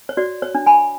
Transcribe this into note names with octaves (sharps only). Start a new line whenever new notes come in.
C#5
F#4 D5
C#5
D4
G#5 B5